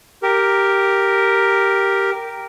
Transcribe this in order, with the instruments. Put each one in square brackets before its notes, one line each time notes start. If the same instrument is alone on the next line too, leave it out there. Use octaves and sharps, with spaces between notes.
[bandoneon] G4 A#4